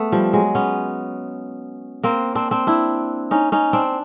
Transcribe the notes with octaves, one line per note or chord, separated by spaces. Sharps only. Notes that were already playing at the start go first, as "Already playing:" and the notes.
Already playing: A3 B3
F3 G3
F#3 G#3
B3 C#4
A#3 C4
C4 D4
C4 D4
D4 E4
C#4 D#4
C#4 D#4
C4 D4